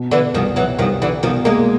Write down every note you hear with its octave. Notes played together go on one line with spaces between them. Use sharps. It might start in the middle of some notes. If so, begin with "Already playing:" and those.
Already playing: B2
D3 E3
C2 D#3 F3
E3 F#3
C2 D#3 F3
D3 E3
B2 D#3 F3
G#3 A#3